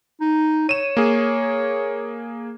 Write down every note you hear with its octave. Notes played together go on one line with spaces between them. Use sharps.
D#4
C#5 D#7 E7
A#3 G#4